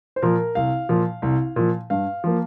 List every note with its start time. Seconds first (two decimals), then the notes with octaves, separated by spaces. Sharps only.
0.16 C5
0.22 A#2 F3 A#4
0.55 C2 F5
0.89 A#2 F3
1.22 C2
1.56 A#2 F3
1.90 G2 F5
2.24 F3 A#3